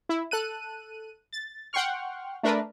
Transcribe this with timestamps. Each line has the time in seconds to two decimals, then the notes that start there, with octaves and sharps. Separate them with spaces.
0.09 E4
0.31 A4 F#6 D#7
1.33 A6
1.73 F#5 G5 C6 C#6 F6
2.43 A3 D4 A#4 B4